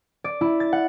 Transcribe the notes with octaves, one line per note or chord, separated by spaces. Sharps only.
D5
E4
A6
F#5